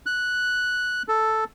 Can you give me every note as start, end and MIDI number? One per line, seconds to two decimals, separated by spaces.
0.06 1.03 90
1.08 1.44 69